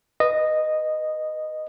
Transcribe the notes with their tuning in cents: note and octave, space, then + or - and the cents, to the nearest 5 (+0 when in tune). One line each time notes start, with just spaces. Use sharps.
B4 +0 D#5 -10